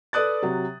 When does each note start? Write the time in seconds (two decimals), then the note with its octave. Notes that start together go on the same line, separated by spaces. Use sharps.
0.13 A4 B4 D5 D#6 F#6 A6
0.42 C3 F#3